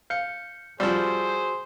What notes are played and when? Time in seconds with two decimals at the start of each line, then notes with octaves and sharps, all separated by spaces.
0.10 F5 G6 C#7
0.80 F3 G3 F#4 G#4 C5 E6